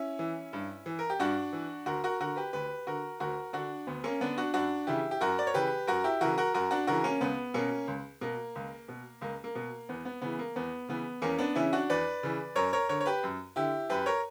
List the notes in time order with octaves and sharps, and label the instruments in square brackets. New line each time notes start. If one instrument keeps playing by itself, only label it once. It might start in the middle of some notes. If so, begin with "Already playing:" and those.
Already playing: [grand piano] C#4 E4
E3
G2
E3
A#4
G4
G2 D4 F#4
E3
D2 F#4 A#4
F#4 A#4
D3 F#4 A#4
G4 B4
D2 G4 B4
D3 F#4 A#4
D2 F#4 A#4
D3 D4 F#4
D2 B3
A#3 C#4
D3 B3 D4
D4 F#4
F#2 D4 F#4
C#3 E3 E4 G4
G4
F#2 F#4 A#4
D5
C#5
C#3 E3 G4 B4
F#2 F#4 A#4
E4 G4
C#3 E3 F#4 A#4
F#4 A#4
F#2 F#4 A#4
D4 F#4
C#3 E3 F#4 A#4
A#3 C#4
C#2 B3
B2 A#3 C#4
C#2
B2 A#3
C#2
B2
C#2 A#3
A#3
B2
E2 B3
B3
C#3 E3 B3
A#3
E2 B3
C#3 E3 B3
E2 A#3 C#4
B3 D4
C#3 E3 C#4 E4
D4 F#4
E2 B4 D5
C#3 E3
F#2 A#4 C#5
A#4 C#5
D3 A#4 C#5
C#5
G4 B4
F#2
D3 E4 G4
F#2 G4 B4
A#4 C#5